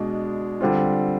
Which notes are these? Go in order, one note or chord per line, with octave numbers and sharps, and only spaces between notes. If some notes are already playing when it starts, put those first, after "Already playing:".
Already playing: B2 G#3 D4
D3 G3 C4 F4